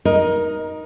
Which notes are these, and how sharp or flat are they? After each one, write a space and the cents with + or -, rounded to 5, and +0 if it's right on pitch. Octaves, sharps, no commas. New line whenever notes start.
D#4 +0 A#4 +20 D#5 -5